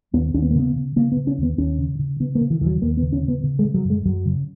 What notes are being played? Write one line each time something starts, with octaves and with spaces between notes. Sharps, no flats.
D#2 B3
D#2 C#4
B3
A#3
C#3 B3
C#3
C#3 A#3
B3
C#3
C#4
D#2 B3
D#2 C#4
C#3
C#3
C#3 B3
A#3
C#3
E3
D#2 E3
F#3
D#2 A#3
B3
C#3
C#4
C#3
B3
C#3
G#3
C#3
F#3
F#2
G#3
F#2 F#3
C#3